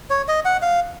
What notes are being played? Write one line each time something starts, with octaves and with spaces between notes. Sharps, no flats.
C#5
D#5
F#5
F5